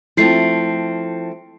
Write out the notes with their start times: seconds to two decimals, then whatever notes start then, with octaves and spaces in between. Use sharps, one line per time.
0.17 F3 A3 C4 E4 C7